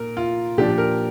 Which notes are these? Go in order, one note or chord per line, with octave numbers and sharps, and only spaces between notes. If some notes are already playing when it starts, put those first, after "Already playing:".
Already playing: A#2 A#4
F4
A#2 F3 D4 G4
A#4